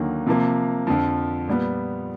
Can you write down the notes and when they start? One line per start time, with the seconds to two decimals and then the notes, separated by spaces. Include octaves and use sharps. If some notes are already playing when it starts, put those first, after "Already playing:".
Already playing: D#2 D3 F#3 A#3 D#4
0.27 C3 F3 A#3
0.87 F2 D3 F3
1.48 A#2 G3 B3